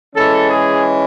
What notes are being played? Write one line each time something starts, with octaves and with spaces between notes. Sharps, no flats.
E3 G#3 C#4 A4
G#4